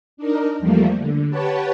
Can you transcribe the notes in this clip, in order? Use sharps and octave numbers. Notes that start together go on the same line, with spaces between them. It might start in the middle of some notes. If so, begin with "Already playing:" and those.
D4 D#4 A#4
E2 F3 G3 A3 A#3
D3
G4 B4 C#5 F#5 A5